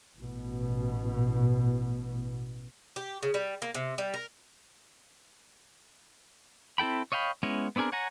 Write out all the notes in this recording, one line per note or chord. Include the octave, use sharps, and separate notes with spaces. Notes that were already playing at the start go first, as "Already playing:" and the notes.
A1 B2
G4
C#3
G3
A#3
C3
G3
A#4
C4 E4 A4 G5 B5
C#5 D#5 F5 G5 B5
G#3 B3 C#4 E4
B3 C4 D4 G#4 A#4
C#5 F#5 G#5 A#5